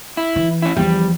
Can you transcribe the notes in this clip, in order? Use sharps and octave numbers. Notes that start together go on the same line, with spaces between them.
E4
E3
C#4 E4
E2 F3 G3